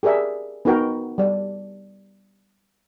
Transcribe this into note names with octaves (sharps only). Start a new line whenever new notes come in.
G4 G#4 A#4 D5 E5
B3 D#4 F#4 A#4 G5
G3 D5